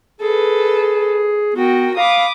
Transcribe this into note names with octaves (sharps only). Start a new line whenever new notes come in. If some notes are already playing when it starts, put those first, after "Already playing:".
G#4 A4 B4
B3 F#4 A#4 G5
F5 B5 D6 D#6